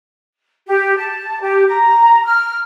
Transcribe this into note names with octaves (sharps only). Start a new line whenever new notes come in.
G4
A5
G4
A#5
F6